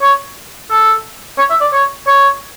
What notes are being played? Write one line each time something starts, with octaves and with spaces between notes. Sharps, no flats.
C#5
A4
C#5
E5
D5
C#5
C#5